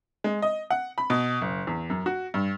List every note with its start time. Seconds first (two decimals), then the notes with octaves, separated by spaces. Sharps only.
0.24 G#3
0.42 D#5
0.70 F#5
0.98 B5
1.10 B2
1.42 F#1
1.67 E2
1.90 F#2
2.06 F#4
2.34 G2